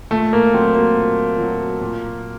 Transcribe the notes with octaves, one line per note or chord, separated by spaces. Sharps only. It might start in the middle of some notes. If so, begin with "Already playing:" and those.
A#2 A3
A#3
F#3 C4
A#3
A#2
F#3
A#2